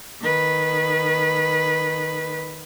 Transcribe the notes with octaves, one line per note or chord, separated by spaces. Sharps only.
D#3 B4